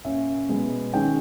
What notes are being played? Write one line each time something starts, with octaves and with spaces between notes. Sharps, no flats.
A#2 A#3 C#4 E5
B2 G#3 B3
D#3 G#3 C#4 G5